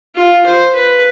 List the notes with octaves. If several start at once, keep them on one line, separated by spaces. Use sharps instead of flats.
F4
C5
B4